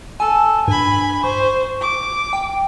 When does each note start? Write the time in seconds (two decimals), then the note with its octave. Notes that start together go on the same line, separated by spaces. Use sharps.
0.20 A4 G#5
0.68 G2 G#5 B5
1.24 C5 C#6
1.81 D6
2.33 G5